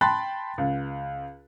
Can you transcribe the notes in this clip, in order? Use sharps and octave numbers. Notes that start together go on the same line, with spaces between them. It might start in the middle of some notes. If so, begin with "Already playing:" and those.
G5 A5 B5 C6 F#6 A6
C#2